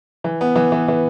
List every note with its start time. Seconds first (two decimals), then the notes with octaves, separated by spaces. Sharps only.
0.24 E3
0.41 B3
0.56 E3
0.72 E3
0.88 E3